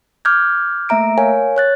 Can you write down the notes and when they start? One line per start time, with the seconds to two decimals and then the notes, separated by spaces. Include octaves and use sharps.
0.25 D6 F6 G6 G#6
0.89 A3 A#3 E5 A#5 D7
1.18 A#4 C#5 F5 G#5
1.56 C#5 F#6 A6